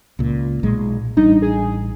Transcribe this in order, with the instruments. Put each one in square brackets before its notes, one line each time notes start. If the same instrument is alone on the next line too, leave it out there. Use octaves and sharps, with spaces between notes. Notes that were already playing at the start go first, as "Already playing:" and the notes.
[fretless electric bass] C#2 A#2
B1 A#2 G#3
[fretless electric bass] A1 G3 D4 [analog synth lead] D#4
[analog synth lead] G#4